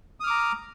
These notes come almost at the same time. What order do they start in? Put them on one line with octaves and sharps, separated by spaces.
D#6 F6 D6 A#5